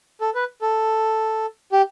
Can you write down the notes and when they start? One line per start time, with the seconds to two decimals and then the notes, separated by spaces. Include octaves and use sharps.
0.21 A4
0.35 B4
0.61 A4
1.72 G4